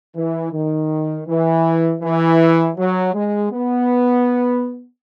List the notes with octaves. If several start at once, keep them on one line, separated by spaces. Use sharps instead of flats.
E3
D#3
E3
E3
F#3
G#3
B3